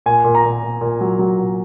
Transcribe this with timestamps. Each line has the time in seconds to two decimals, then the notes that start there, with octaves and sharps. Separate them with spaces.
0.06 A#2 G#5
0.24 A#2
0.35 A#5
0.44 A#2
0.62 A#2
0.81 A#2
1.01 F#3
1.19 F#3
1.38 A#2